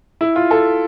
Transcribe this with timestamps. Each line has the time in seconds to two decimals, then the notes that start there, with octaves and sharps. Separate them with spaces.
0.21 E4
0.36 F4
0.51 A4